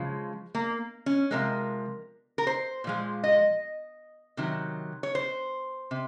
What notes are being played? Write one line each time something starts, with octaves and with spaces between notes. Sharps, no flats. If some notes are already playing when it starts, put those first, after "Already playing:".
Already playing: C#3 F3 G#3
A#3
C#4
C3 F3 G#3 A#4
A#4
C5
A#2 F3 G#3
D#5
C3 D#3 F#3
C#5
C5
C3